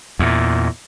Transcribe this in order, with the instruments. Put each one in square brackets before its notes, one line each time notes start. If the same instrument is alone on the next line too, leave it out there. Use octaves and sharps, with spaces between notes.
[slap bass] E2 A#2